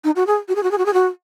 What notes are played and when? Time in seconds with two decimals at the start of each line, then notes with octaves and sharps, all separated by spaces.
0.04 D#4
0.16 F#4
0.27 G#4
0.49 F#4
0.56 G#4
0.63 F#4
0.71 G#4
0.78 F#4
0.86 G#4
0.94 F#4